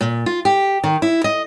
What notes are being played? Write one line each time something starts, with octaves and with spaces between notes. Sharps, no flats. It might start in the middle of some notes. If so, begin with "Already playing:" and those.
A#2
F4
G4
D#3
E4
D#5